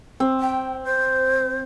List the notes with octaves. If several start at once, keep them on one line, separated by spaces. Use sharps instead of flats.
C4
G5
C5